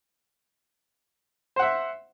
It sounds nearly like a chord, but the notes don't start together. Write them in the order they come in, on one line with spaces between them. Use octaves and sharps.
C5 F#5 E5